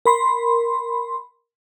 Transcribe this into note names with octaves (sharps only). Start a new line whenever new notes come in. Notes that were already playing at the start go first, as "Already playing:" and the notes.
A#4 B5 C6